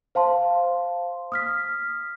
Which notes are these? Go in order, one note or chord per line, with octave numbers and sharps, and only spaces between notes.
C5 F5 A5 C6
D#6 F6 B6